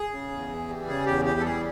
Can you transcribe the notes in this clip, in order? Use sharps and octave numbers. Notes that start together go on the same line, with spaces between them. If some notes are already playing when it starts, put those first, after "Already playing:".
Already playing: G#4
C#3
E2
E3
G3
C#3 G#4
E2 G4
E3 G4
A4
G3 G#4